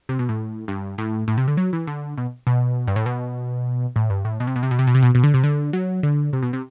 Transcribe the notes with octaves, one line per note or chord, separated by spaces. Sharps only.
C3
B2
A2
G2
A2
A2
C3
D3
F#3
E3
D3
B2
B2
G2
A2
B2
A2
G2
A2
B2
C3
B2
C3
B2
C3
B2
C3
B2
B2
D3
C3
D3
F#3
D3
C3
B2
C3